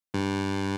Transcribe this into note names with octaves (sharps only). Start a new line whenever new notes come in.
G2